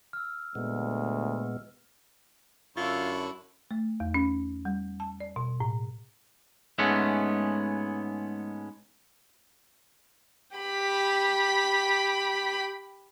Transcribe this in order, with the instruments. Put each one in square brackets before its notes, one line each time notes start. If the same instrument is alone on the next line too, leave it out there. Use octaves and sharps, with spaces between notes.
[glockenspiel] E6 F6
[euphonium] D2 [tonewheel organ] A#2 G#3 B3
[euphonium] F#2 [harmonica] D3 E4 C#6 [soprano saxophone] F4
[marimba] A3
E2
C#4
G3
A5
D5
B2
A2
[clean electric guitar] G#2 G#3 A3 B3 C#4
[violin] G4 B5